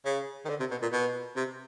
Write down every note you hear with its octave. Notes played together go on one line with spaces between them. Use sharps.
C#3
D#3
D3
C3
B2
A#2
B2
C3